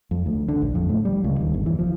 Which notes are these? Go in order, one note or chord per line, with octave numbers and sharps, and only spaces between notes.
F2
D2
D3
A#1
F2
A2
G3
C#2
D#2
G1
E3
F3